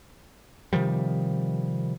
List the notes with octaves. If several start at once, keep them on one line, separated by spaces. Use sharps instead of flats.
C3 D#3 F3 G3